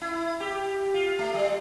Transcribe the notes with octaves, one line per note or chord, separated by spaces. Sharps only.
E4
G4
F4
A3
G3